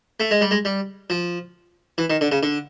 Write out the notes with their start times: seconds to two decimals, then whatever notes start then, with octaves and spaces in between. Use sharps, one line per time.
0.20 A3
0.31 G#3
0.41 G3
0.51 G#3
0.65 G3
1.10 F3
1.98 E3
2.10 D#3
2.21 D3
2.32 C#3
2.43 D3